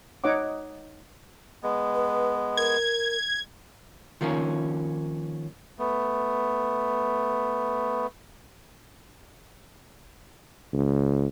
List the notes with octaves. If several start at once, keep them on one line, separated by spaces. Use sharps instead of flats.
D#4 C#5 D#5 F#5 D6
G#3 B3
B4
A#4 G#6
D#3 F3 A#3 C#4
A3 B3
C#2